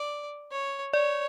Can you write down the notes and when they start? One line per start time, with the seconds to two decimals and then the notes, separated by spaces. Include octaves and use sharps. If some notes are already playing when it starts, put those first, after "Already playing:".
Already playing: D5
0.51 C#5
0.93 C#5 D5